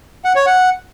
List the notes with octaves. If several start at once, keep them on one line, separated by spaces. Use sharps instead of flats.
F#5
C#5
F#5